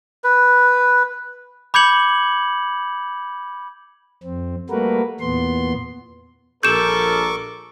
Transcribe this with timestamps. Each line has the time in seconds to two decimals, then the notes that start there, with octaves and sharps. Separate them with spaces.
0.24 B4
1.74 B5 D6 G6 G#6 C#7 F#7
4.24 F2 C4
4.70 G3 A3 A#3 F#4 A#4 B4
5.20 E2 A#2 B3 C6
6.63 A#1 G3 A4 A#4 C#6 D6 G6 E7